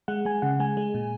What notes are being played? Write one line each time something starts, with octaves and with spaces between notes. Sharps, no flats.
G#3 F#5
G#3 G#5
C#3 F#5
G#3 G#5
G#3
A#2